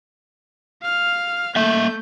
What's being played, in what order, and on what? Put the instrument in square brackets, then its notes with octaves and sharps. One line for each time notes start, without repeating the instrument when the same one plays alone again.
[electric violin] F5 F6
[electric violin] A3 G6 [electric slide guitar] A#3 E5